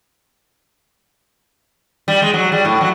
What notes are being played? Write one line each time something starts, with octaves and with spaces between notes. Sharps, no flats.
G3
G#3
F#3
G3
A2
F#3